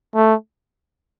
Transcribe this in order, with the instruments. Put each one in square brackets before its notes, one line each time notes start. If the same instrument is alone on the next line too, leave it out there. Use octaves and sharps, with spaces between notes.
[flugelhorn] A3